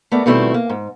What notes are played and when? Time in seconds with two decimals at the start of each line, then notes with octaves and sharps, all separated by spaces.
0.12 A3 B3 A#4 D5
0.26 B2 D#3 G3 A3 C4 E4
0.54 A#3
0.69 G#2